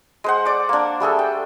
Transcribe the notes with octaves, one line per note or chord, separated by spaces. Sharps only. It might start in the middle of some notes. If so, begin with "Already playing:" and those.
G#3 C5 F#5
D5 D6
A#3 D4
G3 A3 G#4 A4
G5